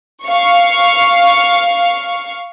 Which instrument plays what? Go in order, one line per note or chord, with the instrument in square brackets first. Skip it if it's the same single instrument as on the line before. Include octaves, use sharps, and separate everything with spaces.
[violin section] F5 C#6